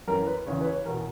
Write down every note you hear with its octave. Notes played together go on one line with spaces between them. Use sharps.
F#2 E3 A#4
B4
E2 C#3 E3 C#5
B4
C#5
E2 B2 A#4